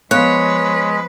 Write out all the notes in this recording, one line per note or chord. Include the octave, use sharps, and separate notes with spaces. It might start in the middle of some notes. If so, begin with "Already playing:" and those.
F3 G#3 B3 B4 C#5 F5 F#6